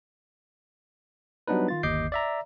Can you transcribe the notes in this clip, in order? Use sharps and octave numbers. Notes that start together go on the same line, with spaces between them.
F#3 G3 B3 D4 D#4 B4
D#3 F4 A6
G1 D#2 D#5 D6 G6 C7
D5 E5 A#5